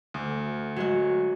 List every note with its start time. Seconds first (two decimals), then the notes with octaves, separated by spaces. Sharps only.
0.14 D2
0.76 F#3 G#3 F#4